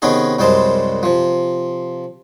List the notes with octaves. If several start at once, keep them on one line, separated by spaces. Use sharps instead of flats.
C3 D#3 B3 C#4 D#4 G#4
C2 F#2 G3 G#3 C5 A5
C3 F3